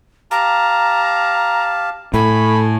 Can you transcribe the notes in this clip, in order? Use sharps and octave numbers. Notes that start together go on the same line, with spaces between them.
G4 F5 A5 A#5
A2 A3 G#5 B5